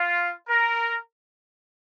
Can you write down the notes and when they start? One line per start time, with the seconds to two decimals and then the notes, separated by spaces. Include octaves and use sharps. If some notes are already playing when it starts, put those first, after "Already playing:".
Already playing: F4
0.49 A#4